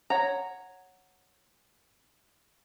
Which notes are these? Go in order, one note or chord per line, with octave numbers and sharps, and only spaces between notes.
C#5 F#5 A#5